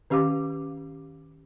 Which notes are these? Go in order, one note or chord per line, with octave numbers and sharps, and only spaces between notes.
D#3 C#4 G4 F5 D6